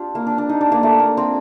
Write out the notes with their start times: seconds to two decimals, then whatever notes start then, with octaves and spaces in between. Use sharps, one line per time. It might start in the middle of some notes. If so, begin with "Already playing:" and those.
Already playing: C4 D4 F4 G4
0.15 A#3
0.27 D4
0.38 D4
0.49 D#4
0.61 D4
0.72 A#3
0.83 A3
0.99 A#3
1.17 C4